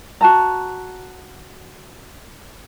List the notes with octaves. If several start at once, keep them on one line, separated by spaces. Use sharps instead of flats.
F#4 A5 A#5